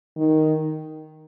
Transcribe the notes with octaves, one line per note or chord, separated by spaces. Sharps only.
D#3